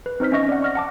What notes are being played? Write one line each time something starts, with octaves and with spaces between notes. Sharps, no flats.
B4
C4 D#4 C5 F6 B6
C#4 D#5 E5 C#6 A#6
D5 F#5
C#6 F6 A#6
F#5 A5 D6